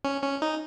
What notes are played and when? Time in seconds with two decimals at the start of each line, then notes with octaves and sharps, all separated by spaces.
0.05 C#4
0.23 C#4
0.42 D#4